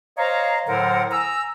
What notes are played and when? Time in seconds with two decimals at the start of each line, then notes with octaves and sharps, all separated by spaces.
0.18 C5 C#5 D#5 F5 A#5
0.67 A2 D3 F#3 A#4 C5 F#5
1.12 G#5 A#5 D#6 E6